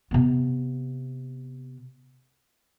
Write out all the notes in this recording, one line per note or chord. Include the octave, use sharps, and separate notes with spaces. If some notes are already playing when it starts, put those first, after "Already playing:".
C3 B3